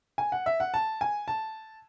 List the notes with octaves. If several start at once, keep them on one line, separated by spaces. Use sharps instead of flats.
G#5
F#5
E5
F#5
A5
G#5
A5